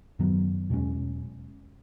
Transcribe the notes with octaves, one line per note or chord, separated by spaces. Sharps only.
F#2 D#3 F#3 B3
E2 B2 G#3 C#4